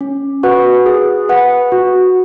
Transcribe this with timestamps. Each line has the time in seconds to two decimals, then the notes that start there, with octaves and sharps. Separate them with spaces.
0.01 C#4
0.43 F#4 B4 F#5
0.86 G#4
1.29 B4 F#5
1.72 F#4